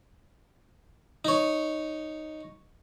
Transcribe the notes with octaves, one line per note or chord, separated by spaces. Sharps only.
D#4 C#5